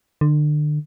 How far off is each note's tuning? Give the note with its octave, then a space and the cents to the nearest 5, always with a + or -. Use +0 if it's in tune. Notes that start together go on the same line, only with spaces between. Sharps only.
D3 +35